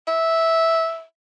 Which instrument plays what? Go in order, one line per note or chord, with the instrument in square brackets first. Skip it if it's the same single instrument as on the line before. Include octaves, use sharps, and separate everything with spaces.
[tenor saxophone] E5